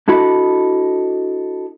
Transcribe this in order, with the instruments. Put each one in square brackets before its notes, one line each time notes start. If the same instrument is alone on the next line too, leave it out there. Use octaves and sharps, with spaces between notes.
[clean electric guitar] D4 E4 F#4 A4 D#5 B5